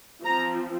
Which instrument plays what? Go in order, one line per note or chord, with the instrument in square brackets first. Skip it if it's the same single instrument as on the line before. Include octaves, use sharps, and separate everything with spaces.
[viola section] F3 C4 A#5